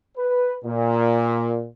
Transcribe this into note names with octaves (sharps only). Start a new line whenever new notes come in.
B4
A#2